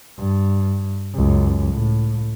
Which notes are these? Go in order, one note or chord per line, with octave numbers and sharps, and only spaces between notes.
G2
C#2 F#2
A2